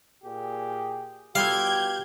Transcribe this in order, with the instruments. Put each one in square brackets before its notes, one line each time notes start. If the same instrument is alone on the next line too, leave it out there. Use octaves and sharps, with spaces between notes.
[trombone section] A#2 G4 G#4
[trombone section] B2 G4 [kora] G3 F4 A4 [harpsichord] F5 [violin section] G6 G#6